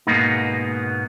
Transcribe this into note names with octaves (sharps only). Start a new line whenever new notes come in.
G#2 B2 F#3 A#3 B3 D#4